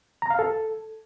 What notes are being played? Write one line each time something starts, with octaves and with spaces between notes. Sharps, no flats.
A#5
F5
A4